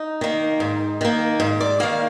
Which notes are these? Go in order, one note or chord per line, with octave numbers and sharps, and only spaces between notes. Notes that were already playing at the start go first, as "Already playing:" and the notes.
Already playing: D#4
D#3 A#3
G#2
D#3 A#3
G#2
D5
D#3 A#3 F5